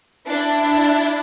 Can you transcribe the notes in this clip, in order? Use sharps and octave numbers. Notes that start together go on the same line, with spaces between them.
D4 E4